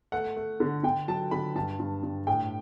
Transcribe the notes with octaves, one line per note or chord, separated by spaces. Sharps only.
A3 F#5
A3
D3
D3 G5
F#3 A5
D3 B5
G2 A5
G2
G2
A2 G5